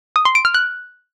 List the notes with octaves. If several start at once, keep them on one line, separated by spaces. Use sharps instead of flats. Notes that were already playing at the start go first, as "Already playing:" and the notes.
D#6
C6
D7
F6
F#6